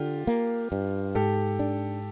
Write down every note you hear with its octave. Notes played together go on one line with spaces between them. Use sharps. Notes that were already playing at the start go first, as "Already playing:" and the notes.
Already playing: D3 F4 G4
A#3
G2
G#2 G4 A4
D4